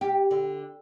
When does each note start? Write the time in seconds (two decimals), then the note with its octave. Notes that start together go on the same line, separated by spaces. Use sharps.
0.01 G4
0.31 D3